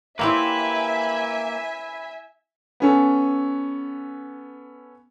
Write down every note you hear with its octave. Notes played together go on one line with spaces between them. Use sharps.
A#3 C4 E4 G4 B4 C#5 E5 G#5
B3 C#4 A4